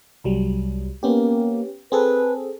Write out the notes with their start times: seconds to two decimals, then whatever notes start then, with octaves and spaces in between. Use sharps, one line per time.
0.24 C2 F#3 G3
1.03 A#3 B3 C#4 G4
1.92 C4 G#4 A4 B4